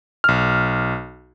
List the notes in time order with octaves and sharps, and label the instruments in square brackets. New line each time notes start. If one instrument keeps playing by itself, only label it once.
[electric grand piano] B1 F6